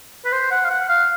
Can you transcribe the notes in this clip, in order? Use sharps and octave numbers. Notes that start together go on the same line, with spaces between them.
B4
C5
F#5
F5
F#5
F5